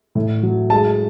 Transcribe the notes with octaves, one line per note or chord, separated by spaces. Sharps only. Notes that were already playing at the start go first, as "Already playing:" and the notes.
A2
F#3
G#3 A5